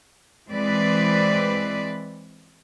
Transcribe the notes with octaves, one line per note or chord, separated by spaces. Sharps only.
E3 G#3 C4 B4 D5